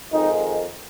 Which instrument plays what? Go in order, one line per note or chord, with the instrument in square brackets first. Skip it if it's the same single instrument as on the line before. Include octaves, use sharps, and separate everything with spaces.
[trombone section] F2 D#3 G#3 D#4